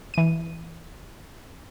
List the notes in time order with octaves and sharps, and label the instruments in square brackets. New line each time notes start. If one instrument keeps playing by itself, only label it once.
[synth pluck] E3 D#7